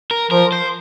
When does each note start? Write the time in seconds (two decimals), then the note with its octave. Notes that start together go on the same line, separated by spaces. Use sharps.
0.11 A#4
0.31 F3 A#4
0.52 C5